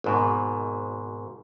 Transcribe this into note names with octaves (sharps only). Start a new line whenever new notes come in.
G#1 G#2 B2